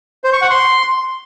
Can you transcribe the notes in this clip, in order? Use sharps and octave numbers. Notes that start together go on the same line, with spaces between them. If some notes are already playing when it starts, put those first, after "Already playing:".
C5
C#6
F#5
C6